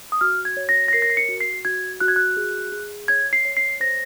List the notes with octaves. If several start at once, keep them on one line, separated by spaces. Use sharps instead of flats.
D#6
F#4 F6
G#6
C#5
A#6
A#6
A#4 C7
A#6
C7
C#7
F#4
C7
F#4 G#6
F#4 F#6
G#6
F#6
G#4
G#4
C#5 G#6
C7
C#5
C7
C5 A#6